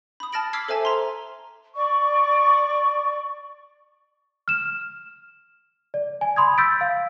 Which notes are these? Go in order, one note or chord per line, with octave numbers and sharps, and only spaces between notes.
B5 D#6
A5 F6 A6 A#6 D7 F#7
D6 E6 F6 G#6 B6 C7
A4 C5 E5 G#5 A5
A#5 C6
D5 C#6
F6 E7
D5
G#5
B5 C6 D#6 G#6
E6 G6 A6 B6 D7
F5